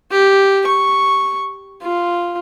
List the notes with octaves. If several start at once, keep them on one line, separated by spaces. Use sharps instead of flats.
G4
C#6
F4